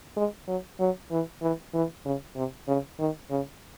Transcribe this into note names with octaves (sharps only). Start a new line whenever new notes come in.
G#3
F#3
F#3
E3
E3
E3
C#3
C3
C#3
D#3
C#3